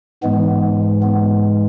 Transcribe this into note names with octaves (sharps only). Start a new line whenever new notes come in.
G#2 E3 G#3 B3
B3